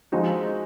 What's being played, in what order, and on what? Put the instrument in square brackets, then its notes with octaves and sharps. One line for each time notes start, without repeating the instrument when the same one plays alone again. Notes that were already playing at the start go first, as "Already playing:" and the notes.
[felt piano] F3 G#3 D#4 F#4